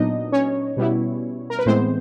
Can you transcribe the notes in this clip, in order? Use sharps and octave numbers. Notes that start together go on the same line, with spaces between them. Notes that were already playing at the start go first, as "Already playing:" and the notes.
Already playing: A#2 F#3 B3 D4 D#4 D#5
C#4 C#5
B2 G3 B3 E4
A#4
B4
A2 E3 G#3 B3 C4 C5